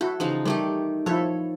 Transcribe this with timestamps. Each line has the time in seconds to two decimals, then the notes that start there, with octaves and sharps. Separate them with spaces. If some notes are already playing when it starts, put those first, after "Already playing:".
0.01 E4 F#4 A4
0.20 C#3 E3 F3 D#4
0.45 D#3 G3 A3 G4
1.06 F3 E4 A4 C#5